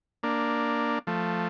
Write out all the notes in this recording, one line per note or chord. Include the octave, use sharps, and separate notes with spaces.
A#3 D4
F3 A3